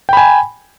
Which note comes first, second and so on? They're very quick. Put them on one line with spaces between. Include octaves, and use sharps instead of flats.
G5 B5 G#5